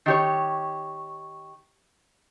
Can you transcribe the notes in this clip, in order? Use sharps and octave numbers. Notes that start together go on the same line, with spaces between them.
D#3 G4 C#5